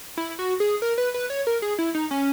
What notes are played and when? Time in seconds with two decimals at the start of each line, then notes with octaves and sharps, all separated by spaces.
0.17 E4
0.39 F#4
0.60 G#4
0.82 A#4
0.98 B4
1.14 B4
1.30 C#5
1.47 A#4
1.62 G#4
1.79 E4
1.95 D#4
2.11 C#4